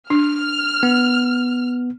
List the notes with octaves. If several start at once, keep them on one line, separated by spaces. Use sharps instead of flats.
D4 F6
B3